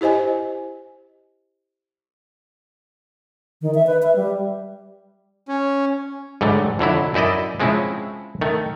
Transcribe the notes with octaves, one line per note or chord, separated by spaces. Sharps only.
E4 G4 C5 D#5 G#5
D#3
E5
B4
E5
G3
C#4
G#2 D3 F#3 G3 A3
F2 D3 F#3 E4
F#2 D#4 E4 D5 D#5
F3 G#3 C4 C#4 E4
D#3 A3